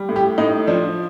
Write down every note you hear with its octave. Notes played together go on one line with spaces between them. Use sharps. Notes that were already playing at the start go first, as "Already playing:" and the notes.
Already playing: G3
A2
G4
A2 D#4
F3 D4